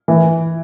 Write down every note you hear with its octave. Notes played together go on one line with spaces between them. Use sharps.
E3